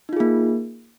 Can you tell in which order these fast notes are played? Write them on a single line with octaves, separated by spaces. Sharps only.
D#4 F4 G#4 A#3